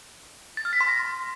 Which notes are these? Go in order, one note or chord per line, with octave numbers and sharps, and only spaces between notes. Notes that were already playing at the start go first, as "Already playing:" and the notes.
A6
F6
B6
C6
A#6